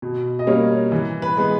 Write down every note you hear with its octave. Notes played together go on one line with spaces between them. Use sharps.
B2
D#5
G3 A#3 C#4 C#5
E3
B4
G#3 B3